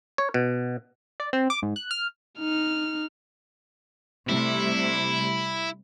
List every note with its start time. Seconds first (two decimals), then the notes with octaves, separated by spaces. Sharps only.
0.18 C#5
0.34 B2
1.20 D5
1.33 C4
1.50 D6
1.62 G#2
1.76 F#6
1.91 F6
2.39 D#4 F6
4.29 C3 G3 A3 E4